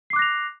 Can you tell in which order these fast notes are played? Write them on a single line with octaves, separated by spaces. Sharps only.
C7 D6 F#6 A#6 F7